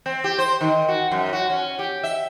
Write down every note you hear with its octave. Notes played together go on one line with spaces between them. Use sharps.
C4
G4
C5
D#3
F#4
F#2
F#4
C#4
G4
E5